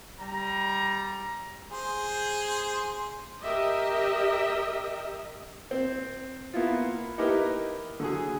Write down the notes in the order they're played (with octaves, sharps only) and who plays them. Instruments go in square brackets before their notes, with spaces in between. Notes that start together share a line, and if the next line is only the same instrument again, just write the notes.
[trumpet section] G3 A#5
[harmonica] G#4 C5
[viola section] G4 A#4 D#5 E5
[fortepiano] C4
A#3 B3 E4 F4
D#4 E4 G4 A#4 B4
D3 F#3 G#4